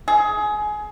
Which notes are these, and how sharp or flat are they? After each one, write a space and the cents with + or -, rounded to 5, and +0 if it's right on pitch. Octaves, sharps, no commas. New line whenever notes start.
G#4 +20